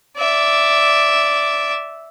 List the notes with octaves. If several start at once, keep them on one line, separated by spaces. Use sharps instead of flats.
D5 E5